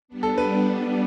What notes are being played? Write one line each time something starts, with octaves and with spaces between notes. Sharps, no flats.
G3 B3 D4
A4
B4